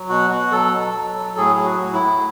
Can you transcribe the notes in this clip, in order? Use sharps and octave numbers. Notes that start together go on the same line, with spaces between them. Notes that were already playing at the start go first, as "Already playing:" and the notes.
Already playing: F#3
B2 F#4
B2 F#4
F#3 A4
F#3
F#3
F#3
A2 G#4
F#3 G#4
F#4
A2
E4
A2